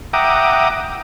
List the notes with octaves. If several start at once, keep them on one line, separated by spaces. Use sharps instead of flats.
E5 F#5 G5 A#5 D6 D#6